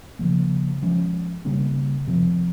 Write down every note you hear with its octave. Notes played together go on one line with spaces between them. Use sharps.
C#3 F3 A#3
F3 G#3 C#4
C#3 G3 A#3 C#4
C3 F3 C4